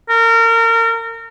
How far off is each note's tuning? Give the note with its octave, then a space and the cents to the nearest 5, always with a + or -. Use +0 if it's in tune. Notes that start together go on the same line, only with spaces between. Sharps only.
A#4 -30